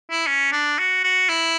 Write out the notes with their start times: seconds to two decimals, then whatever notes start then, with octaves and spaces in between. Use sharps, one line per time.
0.11 E4
0.27 C#4
0.53 D4
0.79 F#4
1.04 F#4
1.29 E4